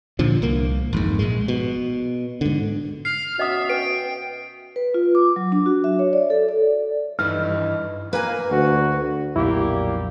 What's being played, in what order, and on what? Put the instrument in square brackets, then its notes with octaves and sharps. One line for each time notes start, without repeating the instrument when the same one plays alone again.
[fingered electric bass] A#2 D3 F3
C2 A#3
G#1 F2 G#2
A#1 G#3
B2
G#2 D3
[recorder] F6 [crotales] C7
[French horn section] B2 C#4 F#4 [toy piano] D#5 F#5 D#6 [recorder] E5
[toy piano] B4 D#5 [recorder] G5 [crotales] D7
[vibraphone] B4
F4
D6
F#3
D4
F#4
E5
C#5
D5
A4
D5
[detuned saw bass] G2 [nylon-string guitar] D#3 E3 D#4 [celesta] F6
[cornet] A#3 [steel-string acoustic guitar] B4 G#5
[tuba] D2 [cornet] F#4
[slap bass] B1 F2 A#2 [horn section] A#3 G4 D5 [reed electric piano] E4